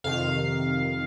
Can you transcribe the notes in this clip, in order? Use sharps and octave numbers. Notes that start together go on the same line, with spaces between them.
F2 C3 D#3 F5